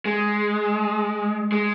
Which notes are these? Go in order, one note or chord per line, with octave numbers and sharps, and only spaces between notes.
G#3
G#3